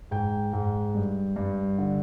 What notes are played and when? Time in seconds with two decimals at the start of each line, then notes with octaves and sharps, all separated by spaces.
0.11 G#2 G5
0.53 G#2
0.95 G2
1.36 G2
1.79 D3